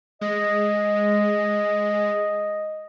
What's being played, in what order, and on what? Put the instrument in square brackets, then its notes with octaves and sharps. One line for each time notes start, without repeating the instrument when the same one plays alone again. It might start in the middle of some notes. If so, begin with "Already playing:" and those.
[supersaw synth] G#3 [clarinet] D#5